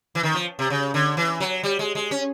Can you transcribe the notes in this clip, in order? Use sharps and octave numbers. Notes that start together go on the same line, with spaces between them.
E3
D#3
F3
C3
C#3
D3
E3
F#3
G3
G#3
G#3
C#4